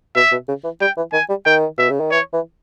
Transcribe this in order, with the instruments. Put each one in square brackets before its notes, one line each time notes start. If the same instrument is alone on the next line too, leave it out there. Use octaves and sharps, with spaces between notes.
[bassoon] B2 [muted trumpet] E5
[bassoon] B2
C#3
E3
[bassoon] G3 [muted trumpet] G5
[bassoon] E3
[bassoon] D#3 [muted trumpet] G#5
[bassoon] G3
[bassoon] D#3 [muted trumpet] G5
[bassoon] B2 [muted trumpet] E5
[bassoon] C#3
D#3
[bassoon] E3 [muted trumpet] C#5
[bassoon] E3